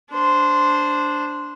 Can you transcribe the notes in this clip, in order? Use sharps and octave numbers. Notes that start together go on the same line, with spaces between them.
D4 C5